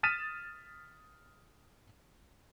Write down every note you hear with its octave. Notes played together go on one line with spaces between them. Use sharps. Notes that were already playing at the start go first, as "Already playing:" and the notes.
D#6 F6 A6 B6 D#7 E7